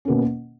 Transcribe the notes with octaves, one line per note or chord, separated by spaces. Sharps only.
B2 A#3 C#4